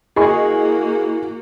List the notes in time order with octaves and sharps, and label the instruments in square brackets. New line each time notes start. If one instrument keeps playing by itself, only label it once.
[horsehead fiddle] A#3 F#4 [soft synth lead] E4 [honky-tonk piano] G#4 D#5 C#6